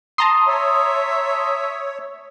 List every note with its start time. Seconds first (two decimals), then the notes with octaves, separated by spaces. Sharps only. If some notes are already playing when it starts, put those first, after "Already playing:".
0.18 A5 A#5 C6 D#6
0.48 C#5 E5